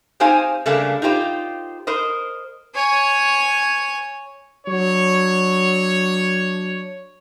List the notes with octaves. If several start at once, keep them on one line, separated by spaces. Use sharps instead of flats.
C4 D#4 G4 C5 F5 G#5
C#3 G3 A3 A#3 D4
D#4 F4 G4 C5
A#4 C5 D#5
C#5 G#5
F#3 D4 C#5